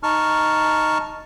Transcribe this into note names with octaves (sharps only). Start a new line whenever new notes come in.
D#4 A5 C#6 F6